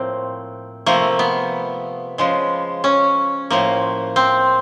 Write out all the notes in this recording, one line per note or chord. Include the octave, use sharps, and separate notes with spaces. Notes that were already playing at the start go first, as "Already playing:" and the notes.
Already playing: A2 F3 A#3 C4
C3 F3 A3 A#3
B3
C#3 F3 G#3
C#4
A2 F3 A#3
C4